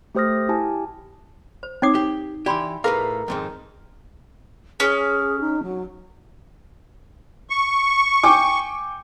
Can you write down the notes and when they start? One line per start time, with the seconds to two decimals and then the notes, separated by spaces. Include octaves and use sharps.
0.15 A3 G4 C5 D#6 F6 A#6
0.49 E4 G4 G#5 A5
1.63 C5
1.82 C4 D#4 C#5 D6 D#6 C7
1.95 G4
2.46 E3 G4 D5 B5 C6
2.84 A2 G#4 A#4 B4 F5
3.28 F2 G#2 D#3
4.80 C#4 G#4
5.40 D#4
5.62 F#3
7.50 C#6
8.24 G5 G#5 D6